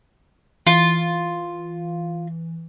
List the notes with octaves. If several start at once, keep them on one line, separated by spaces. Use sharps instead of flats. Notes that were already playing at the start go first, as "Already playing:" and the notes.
E3 F4